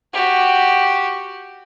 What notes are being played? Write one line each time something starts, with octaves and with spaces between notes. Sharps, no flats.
F#4 G4